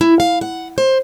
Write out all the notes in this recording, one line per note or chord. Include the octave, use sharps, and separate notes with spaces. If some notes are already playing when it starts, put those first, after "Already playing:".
E4
F5
F#5
C5